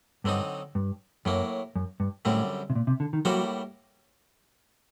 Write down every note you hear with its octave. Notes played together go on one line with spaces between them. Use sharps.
G2 D3 F#3 C4 D#4
G2
F#2 A2 F#3 A#3
F#2
G2
F#2 A2 D3 G3 C4
C3
A#2
C3
D3
D#3
A2 F#3 G3 A#3 F#4 C5